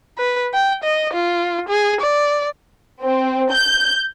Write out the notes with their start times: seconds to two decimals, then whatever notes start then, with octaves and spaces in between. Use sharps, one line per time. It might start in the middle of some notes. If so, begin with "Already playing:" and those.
0.18 B4
0.54 G5
0.84 D#5
1.14 F4
1.69 G#4
2.01 D5
3.02 C4
3.51 G6